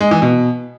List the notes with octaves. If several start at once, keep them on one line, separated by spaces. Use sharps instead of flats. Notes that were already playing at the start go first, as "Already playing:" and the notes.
G#3
E3
B2